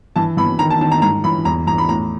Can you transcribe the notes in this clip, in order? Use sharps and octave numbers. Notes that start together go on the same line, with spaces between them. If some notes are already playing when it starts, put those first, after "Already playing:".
E3 A5
E3 B5
D#3 A#5
A5
D#3 A5
A#5
G#2 A#5
E3 B5
E2 A#5
E2 A#5
B5
A2 A#5